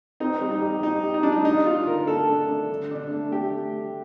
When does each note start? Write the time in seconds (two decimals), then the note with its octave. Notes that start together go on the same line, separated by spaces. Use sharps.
0.20 C4 D#4
0.41 G3
0.51 D#4
0.62 G4
0.82 D#4 G4
1.03 G4
1.14 D#4
1.23 G3 D4
1.32 D#4
1.45 D4 D#4
1.66 D4 F4
1.86 D3 A#4
2.07 A3 A4
2.28 D4
2.48 D4
2.70 D3
2.91 D4
3.11 A3
3.32 A3 G4